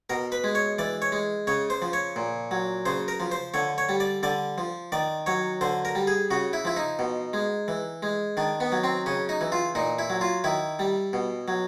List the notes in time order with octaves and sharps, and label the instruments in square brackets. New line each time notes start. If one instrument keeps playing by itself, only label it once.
[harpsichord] B2 A#4
B4
G#3
C#5
E3 D5
C#5
G#3
C#3 C#5
C5
F3
C#5
A#2
F#3
C#3 C5
A#4
F3
C5
D3 C#5
C#5
G3
D5
D3 D5
F3
D#3 D5
F#3 C#5
D3 C5
A#4
G3
G#4
C#3 F#4
E4
F3 E4
D#4
B2
G#3
E3
G#3
D#3 D4
B3
F#3
C4
C#3 C#4
D#4
E3
F4
A#2 D#4
E4
F#3
F4
D#3 E4
G3
B2
F#3